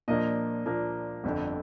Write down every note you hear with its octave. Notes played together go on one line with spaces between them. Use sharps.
A#2 F3 A#3 D4 D#5
A#2 F3 A#3 D4
G1 F2 D3